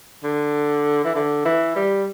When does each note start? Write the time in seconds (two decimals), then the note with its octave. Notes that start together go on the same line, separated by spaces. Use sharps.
0.24 D3
1.04 E3
1.15 D3
1.46 E3
1.76 G3